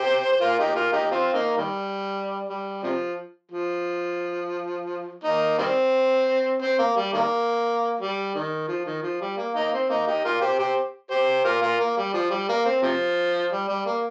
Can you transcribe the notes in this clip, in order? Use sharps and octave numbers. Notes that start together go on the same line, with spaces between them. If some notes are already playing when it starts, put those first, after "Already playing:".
Already playing: G4 C5
C5
F4 A#4
D#4 G4
F4 A#4
D#4 G4
C4 F4
A#3 D#4
D#3 G3
G3
C3 F3
F3
A#3 D#4
D#3 G3 C4
C4
A#3
G3
D#3 G3 A#3
G3
D#3
F3
D#3
F3
G3
A#3
A#3 D#4
C4
A#3 D#4
D#4 G4
F4 A#4
G4 C5
G4 C5
G4 C5
F4 A#4
F4 A#4
A#3
G3
F3
G3
A#3
C4
C3 F3
G3
G3
A#3